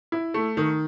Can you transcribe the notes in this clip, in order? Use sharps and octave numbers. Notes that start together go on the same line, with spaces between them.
E4
A3
D#3